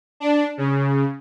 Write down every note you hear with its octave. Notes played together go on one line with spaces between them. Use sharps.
D4
C#3